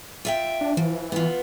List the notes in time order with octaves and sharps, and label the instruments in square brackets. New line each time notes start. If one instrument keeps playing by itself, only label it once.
[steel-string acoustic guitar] F4 E5 G5
[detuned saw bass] D4
[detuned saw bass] E3 [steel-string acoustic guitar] F3
[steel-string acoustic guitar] B3 F4